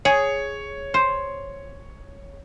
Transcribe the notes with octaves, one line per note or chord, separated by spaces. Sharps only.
G#4 C#5
C5